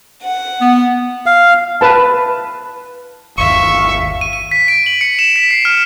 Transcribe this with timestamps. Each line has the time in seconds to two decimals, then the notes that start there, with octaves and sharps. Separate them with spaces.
0.23 F#5
0.61 B3
1.26 F5
1.81 B4 A5
3.38 G1 D#2 E5 F5 C#6
4.21 D#7
4.33 D#7
4.51 B6
4.68 D7
4.86 F#7
5.01 C#7
5.19 E7
5.36 B6
5.51 C7
5.65 F6